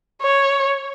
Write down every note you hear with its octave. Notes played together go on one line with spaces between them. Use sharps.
C#5